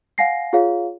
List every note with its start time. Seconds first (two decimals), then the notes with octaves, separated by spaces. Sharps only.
0.18 F5 F#5 G#5 A#6 C7
0.53 F4 G#4 C#5 F5